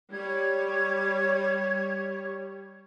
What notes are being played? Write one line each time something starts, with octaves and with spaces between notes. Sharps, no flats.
G3 C#5 G#6